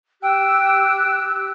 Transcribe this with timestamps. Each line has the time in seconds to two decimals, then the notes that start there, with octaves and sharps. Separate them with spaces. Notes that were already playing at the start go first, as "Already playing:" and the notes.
0.22 G4 G5 E6 F#6